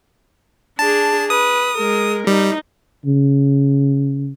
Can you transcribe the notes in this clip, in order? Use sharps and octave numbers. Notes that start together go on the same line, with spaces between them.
D4 G#4 A5
B4 D#6
G#3 A#4
G3 D#4
C#3